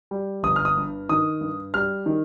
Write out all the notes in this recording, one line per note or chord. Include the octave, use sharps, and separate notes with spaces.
G3
G1 D#6
F6
D#6
G2
D#3 D#6
G2
G3 F6
D#3